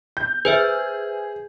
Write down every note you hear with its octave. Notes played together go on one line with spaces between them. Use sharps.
G6
G#4 B4 C5 E5